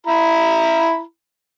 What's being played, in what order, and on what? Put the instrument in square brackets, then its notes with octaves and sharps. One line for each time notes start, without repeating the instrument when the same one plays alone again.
[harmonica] E4 A#5 B5